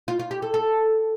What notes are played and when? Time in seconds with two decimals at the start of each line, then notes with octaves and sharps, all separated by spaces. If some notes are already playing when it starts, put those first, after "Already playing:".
0.08 F4
0.19 F4
0.31 G4
0.42 A4
0.54 A4